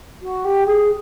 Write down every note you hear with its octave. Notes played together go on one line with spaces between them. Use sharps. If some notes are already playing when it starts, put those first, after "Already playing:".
F#4
G4
G#4